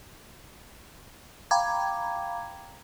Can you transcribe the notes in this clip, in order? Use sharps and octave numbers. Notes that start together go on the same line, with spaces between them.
F5 G5 A#5 B5 D6 G#6